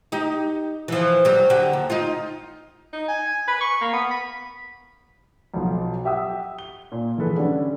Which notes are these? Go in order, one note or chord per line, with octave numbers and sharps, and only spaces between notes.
D#4 G4
E3 F3
F#3 G3
D3 F#4 G4
D#2
D#4 F4
D#4
G#5
B4
C#6
A#3
B3
B5
B1 B2 F3 F#3
G4 E5 F#5 D#6 E6
G7
A#2
E3 F3 G#4 A4 B4
D3 G3 A3 C#4 D4